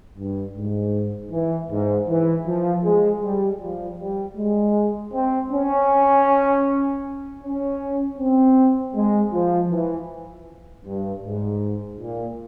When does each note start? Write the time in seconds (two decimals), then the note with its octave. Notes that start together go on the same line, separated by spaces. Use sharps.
0.18 G2
0.56 G#2
1.32 E3
1.71 G#2
2.08 E3
2.46 F3
2.84 G#3
3.23 G3
3.61 F3
3.99 G3
4.38 G#3
5.13 C4
5.51 C#4
7.43 C#4
8.18 C4
8.95 G#3
9.33 F3
9.71 E3
10.86 G2
11.24 G#2
12.00 A#2